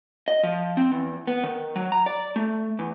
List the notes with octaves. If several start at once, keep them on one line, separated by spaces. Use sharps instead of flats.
D#5
F3
C4
E2
B3
D#3
F#3
A#5
D5
A3
E2